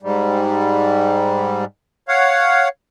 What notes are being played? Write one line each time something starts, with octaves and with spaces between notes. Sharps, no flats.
G#2 G3
C#5 F5 F#5